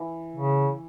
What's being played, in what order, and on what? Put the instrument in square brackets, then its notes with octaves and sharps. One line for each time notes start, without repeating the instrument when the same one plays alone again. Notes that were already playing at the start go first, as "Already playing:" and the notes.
Already playing: [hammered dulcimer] E3
[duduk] C#3